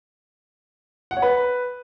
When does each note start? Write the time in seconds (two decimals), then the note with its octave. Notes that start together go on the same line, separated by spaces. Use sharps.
1.11 F#5
1.17 C#5
1.22 B4